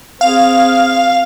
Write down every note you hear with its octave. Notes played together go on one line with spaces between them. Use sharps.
C4 G#4 F5